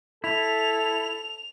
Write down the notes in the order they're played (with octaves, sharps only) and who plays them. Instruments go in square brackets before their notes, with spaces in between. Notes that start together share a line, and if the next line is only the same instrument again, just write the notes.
[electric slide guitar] E4 [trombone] A4 [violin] F7